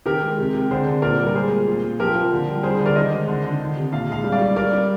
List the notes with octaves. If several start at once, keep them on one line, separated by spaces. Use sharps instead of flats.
D#3 G4 A#4
G#3
C3
C3
D3 G#4 C5
D3
A#2 A#4 D5
G3
A#4
G#3 G#4 C5
A#2
A#2
A#2
F3 G4 A#4
F3
D3
G3
G3 G#4 C5
D3
A#4 D5
D#3 C5 D#5
G#3
D3
D3
D#3
C3
A#2 F5
G#3 F5
G3
D5 F5
G3
G3 A#4 D5
G3